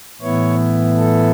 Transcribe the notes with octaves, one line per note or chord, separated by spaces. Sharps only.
A2 E3 B3 E4 C#5
A4